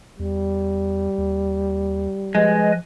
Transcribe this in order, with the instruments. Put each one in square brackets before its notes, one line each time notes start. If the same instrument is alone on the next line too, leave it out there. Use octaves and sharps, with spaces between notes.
[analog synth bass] E2 [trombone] G3
[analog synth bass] D#2
[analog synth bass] F3 [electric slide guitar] G#3 [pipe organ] B4 D#5 G#5